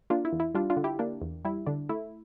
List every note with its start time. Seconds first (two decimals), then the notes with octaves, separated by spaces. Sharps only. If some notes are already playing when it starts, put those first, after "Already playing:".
0.10 A#3 D4 F4
0.25 E4
0.33 E2
0.40 E4
0.55 G3 D4 F4
0.70 D4 F4
0.77 D3
0.84 E4 G4
0.99 A#3 D4
1.22 E2
1.45 G3 E4
1.67 D3 D4
1.89 A3 E4